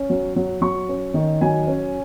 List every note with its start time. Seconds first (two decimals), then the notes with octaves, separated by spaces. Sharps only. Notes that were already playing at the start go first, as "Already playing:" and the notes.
Already playing: C#4
0.10 F#3
0.36 F#3
0.61 F#3 C#6
0.89 C#4
1.14 D#3
1.41 F#3 G#5
1.67 C#4